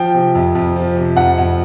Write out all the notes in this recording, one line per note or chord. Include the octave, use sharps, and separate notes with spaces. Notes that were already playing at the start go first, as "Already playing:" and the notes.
Already playing: F3 G5
C3
F2
F2
F3
C3
F2 F#5
F2